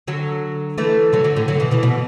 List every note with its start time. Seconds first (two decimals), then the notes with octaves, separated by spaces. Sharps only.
0.07 D3 F#3
0.78 E3 A3
1.13 D3 F#3
1.24 D3 F#3
1.36 A2 D3
1.48 D3 F#3
1.60 B2 E3
1.71 B2 E3
1.83 B2